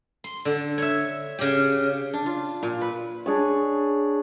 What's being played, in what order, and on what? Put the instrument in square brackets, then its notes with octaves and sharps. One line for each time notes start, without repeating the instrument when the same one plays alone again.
[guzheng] C6
D3
C#5 E5
C#3 G4
[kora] D4
F4
A#2
B4
[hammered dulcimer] D4 G#4 C#5